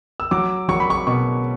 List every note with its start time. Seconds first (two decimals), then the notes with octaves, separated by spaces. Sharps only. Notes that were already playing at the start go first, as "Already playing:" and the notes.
0.20 E6
0.31 F#3 D6
0.69 F#3 C#6
0.80 B5
0.90 C#6
1.07 B2 C#6